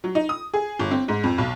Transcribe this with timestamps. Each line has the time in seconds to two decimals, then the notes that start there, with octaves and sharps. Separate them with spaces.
0.04 F#3
0.15 D#4
0.29 D#6
0.54 G#4
0.79 G1
0.91 C4
1.08 G#2
1.24 F2
1.38 B1